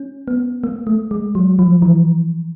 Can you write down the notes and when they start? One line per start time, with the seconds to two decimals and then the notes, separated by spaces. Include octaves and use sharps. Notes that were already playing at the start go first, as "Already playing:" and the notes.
Already playing: C#4
0.28 B3
0.64 A#3
0.87 A3
1.11 G#3
1.35 F#3
1.59 F3
1.82 E3